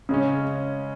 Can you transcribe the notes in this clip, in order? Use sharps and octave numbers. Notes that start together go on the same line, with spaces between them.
C#3 G#3 C#4